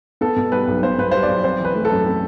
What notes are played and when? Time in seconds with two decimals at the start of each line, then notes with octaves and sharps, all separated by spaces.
0.21 B3 A4
0.36 B2
0.52 G3 B4
0.67 B1
0.82 B3 C5
0.98 B2 B4
1.11 G3 C5
1.23 D5
1.28 B1
1.44 C4 C5
1.59 E3
1.65 B4
1.75 A3
1.85 A4
1.90 F#2
2.05 C4